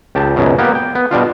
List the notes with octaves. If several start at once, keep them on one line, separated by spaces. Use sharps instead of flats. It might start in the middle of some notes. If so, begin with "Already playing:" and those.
C#2 G4 A5
C#2 F#2 B2
A#3 B3 G4
G5
B3
B2 G3 D4 F4